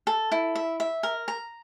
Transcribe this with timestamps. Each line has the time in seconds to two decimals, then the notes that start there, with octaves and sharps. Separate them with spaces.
0.07 A4
0.32 E4
0.55 E5
0.80 E5
1.03 A#4
1.28 A#5